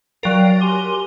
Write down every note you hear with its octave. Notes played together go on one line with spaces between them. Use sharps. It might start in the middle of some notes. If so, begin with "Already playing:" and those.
F#3 A#4 D5 F5 G5
G4 G#5 C6